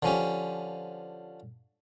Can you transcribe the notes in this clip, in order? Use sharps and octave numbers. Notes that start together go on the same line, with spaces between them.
D3 F3 C#4 G4